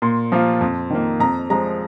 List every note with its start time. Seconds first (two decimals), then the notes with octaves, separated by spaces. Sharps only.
0.02 A#2 C6
0.32 F3 A#3 F4
0.61 F2
0.90 D#3 A#3
1.20 F2 A#5
1.50 F3 G#3 A#5